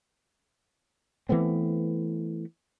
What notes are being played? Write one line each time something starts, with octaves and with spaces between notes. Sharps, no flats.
E3 A3 B3 C4